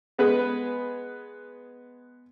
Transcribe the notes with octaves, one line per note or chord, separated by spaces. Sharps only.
G#3 B3 G#4 B4